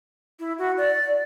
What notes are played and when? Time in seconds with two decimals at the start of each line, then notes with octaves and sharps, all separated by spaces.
0.39 E4
0.58 F#4
0.78 D5